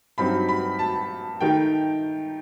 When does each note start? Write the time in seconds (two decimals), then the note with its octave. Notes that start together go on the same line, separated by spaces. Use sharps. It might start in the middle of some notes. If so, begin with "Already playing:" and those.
0.18 G2 F#3 C4 D#4 B5
0.49 B5
0.79 A5
1.41 D#3 A3 D#4 G5